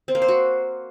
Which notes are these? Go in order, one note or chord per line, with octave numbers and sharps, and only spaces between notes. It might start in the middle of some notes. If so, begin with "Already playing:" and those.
C4
A#3
C5
F#4